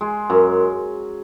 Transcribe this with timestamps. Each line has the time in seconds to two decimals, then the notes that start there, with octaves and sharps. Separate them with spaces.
0.01 G#3
0.30 F#2